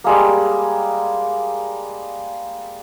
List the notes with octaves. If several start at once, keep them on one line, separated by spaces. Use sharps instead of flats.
G3 G#3 A#3